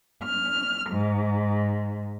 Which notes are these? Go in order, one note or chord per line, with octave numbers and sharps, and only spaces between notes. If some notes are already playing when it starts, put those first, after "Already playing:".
F6
G#2